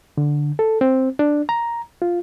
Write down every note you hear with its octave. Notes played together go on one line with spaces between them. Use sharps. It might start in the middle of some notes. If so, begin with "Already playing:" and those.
D3
A4
C4
D4
A#5
F4